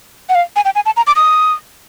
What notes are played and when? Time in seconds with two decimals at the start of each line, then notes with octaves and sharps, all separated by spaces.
0.29 F#5
0.35 F5
0.56 G#5
0.65 G5
0.75 G#5
0.86 A5
0.97 A#5
1.07 D6
1.16 D#6